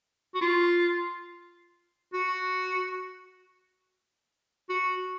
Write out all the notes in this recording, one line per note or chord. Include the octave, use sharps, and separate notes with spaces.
F#4
F4
F#4
F#4